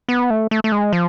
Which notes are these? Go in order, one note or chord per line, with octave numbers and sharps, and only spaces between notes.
B3
A3
A3
A3
G#3
F3